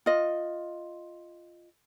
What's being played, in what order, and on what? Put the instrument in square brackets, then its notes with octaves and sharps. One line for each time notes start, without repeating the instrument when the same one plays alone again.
[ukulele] F4 D#5